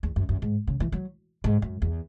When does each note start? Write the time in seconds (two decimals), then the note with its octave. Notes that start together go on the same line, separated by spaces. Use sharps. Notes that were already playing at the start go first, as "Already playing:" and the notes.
0.03 E2
0.16 F#2
0.29 F#2
0.42 G#2
0.67 C#3
0.80 E3
0.92 F#3
1.44 G#2
1.62 F#2
1.82 E2